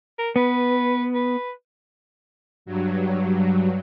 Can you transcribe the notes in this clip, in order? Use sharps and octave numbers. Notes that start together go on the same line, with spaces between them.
A#4
B3 B4
B4
G2 F#3